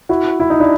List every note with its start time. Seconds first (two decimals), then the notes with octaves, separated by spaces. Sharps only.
0.09 E4 F#4
0.40 E4
0.50 D#4
0.60 D4 E4